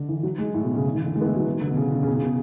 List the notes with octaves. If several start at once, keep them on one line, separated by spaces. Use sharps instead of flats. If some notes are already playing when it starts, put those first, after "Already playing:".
Already playing: D3
E3
F#3
G#3
A2
B2
C#3
D3
E3
D3
G#3
B3
A3
F#3
E3
D3
B2
C#3
C#3
C#3
B2
C#3
B2